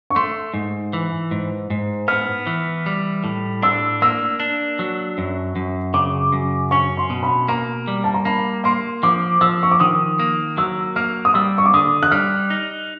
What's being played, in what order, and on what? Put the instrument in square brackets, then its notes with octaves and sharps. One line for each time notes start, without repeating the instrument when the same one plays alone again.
[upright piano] C#6
[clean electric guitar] A3 [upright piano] C6
[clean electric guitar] G#2
E3
G#2
G#2
[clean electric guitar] B3 [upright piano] F6
[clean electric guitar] E3
G3
A2
[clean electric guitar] D4 [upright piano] E6
[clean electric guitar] A#3 [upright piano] E6
[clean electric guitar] D4
F#3
F#2
F#2
[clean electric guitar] C#3 [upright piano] D6
[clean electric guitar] F#2
[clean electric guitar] C#4 [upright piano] C#6
[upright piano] C6
[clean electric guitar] B2
[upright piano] B5
[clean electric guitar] A#3 [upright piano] A#5
[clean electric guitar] G3
[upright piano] A5
A#5
[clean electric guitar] A#3 [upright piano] B5
[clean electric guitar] A#3 [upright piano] C6
[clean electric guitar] F3 [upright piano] D6
[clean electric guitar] F3 [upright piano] E6
[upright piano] C#6
D6
[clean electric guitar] D#3 [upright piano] D#6
[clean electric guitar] A#3
[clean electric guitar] F#3 [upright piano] E6
[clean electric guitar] A#3 [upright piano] F6
[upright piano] D#6
[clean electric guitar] G3 [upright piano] E6
[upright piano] C#6
D6
[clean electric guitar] D3 [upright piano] D#6
[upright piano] F#6
[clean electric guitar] G3 [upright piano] F6
[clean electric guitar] D#4